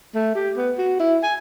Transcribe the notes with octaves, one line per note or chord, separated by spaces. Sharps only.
A3
G4
B3
F#4
E4
G#5